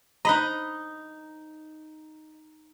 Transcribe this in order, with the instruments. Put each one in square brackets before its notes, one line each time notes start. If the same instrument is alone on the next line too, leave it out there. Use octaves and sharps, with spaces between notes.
[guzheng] D#4 D#5 [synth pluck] A#5 B5 F#6